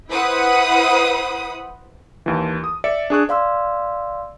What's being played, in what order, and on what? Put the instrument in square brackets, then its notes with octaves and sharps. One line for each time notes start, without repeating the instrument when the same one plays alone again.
[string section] E4 B4 C5 F#5 B5 D#6
[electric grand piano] D#2 E3
D#6
D5 E5 C#7
D4 G#4 C#6 F#6
[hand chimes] D5 F5 C6 E6